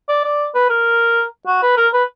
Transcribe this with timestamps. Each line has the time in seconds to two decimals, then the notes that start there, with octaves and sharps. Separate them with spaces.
0.09 D5
0.24 D5
0.55 B4
0.70 A#4
1.47 F#4
1.62 B4
1.77 A#4
1.93 B4